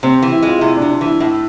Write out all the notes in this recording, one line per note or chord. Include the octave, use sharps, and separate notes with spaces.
C3 C4
E3
E4
G#3 F4
C3 E4
D4
C3
D4
E3 E4
A2 E4